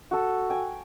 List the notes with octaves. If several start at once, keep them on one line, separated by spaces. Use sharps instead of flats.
F#4 A4
G5 G#5